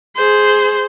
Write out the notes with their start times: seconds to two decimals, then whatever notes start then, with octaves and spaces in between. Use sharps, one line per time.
0.17 G#4 C5